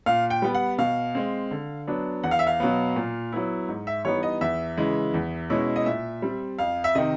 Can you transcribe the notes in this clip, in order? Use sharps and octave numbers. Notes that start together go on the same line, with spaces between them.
A#2 F5
G5
G3 B3
F#5
B2 F5
G#3 C4
D3
F#3 B3 D4
E2 F#5
F5
E5
F5
B2 F#3 B3
A#2
F#3 B3 E4
G#2
E5
E3 G3 B3 D#4 C#5
D#5
E2 E5
C#3 E3 G#3
E2
B2 G#3 C#4 E4
D#5
A#2 E5
G3 C4
F2 F5
E5
C3 D#3 D#5